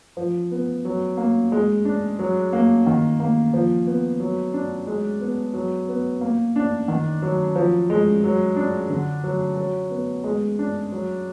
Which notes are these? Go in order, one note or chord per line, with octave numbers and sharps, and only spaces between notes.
F3
B3
F#3
A#3
G#3
D4
F#3
A#3
D#3
A#3
F3
B3
F#3
D4
G#3
B3
F#3
B3
A#3
D4
D#3
F#3
F3
G#3
F#3
D4
D3
F#3
F#3
B3
G#3
D4
F#3